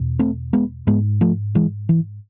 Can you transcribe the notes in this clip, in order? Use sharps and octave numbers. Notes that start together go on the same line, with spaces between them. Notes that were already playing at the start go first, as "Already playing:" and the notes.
Already playing: E2 B2
A3 C4
G#3 B3
G#2 G#3 B3
F3 A3
E3 G#3
E3